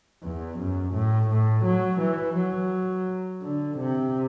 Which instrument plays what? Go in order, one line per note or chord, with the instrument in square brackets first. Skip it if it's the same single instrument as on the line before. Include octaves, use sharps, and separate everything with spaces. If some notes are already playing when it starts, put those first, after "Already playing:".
[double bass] E2
F#2
A2
A2
F#3
E3
F#3
D3
C3